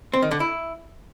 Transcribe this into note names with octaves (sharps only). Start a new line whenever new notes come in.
C4
D#3
D3
E4